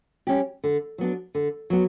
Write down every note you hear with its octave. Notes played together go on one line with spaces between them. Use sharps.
G3 C#4 G4
D3
F#3 B3 D4
D3
F#3 B3